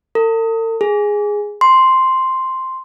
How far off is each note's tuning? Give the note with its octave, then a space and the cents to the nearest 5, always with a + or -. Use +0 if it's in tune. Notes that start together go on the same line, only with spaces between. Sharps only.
A4 +45
G#4 -5
C6 +0